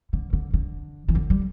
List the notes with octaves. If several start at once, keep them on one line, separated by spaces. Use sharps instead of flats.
D3
D3
D3
E3
D3
G3